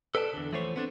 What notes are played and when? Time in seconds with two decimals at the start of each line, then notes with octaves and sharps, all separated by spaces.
0.15 A4 B4 D5 G5 A5
0.34 E2 D3
0.53 E3 F3 A3 B3 C5 C#5
0.76 B3 C4 D4 G#4 A4